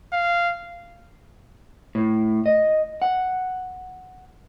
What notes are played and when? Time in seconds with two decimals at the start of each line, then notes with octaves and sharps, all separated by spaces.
0.13 F5
1.95 A2
2.46 D#5
3.02 F#5